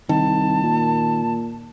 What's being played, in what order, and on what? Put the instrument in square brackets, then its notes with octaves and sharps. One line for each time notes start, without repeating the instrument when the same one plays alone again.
[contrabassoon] C2 [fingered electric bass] D#3 [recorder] A5
[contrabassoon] A#2